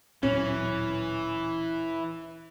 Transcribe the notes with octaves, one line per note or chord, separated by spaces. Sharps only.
D1 A#2 E3 F#3 C#4